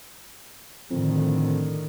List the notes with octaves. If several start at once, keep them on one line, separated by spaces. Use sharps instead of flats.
F2 A2 D3 D#3